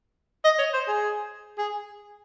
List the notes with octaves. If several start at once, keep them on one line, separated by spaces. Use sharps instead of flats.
D#5
C#5
C5
G#4
G#4